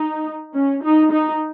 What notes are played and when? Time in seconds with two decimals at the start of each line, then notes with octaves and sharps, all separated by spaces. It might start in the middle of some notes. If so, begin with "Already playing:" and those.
Already playing: D#4
0.55 C#4
0.83 D#4
1.12 D#4